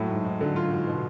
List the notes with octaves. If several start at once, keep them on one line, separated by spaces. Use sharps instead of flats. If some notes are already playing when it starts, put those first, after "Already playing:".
Already playing: A2 F#3
G#2
G#2
D3 F#3
F4
G#2
B2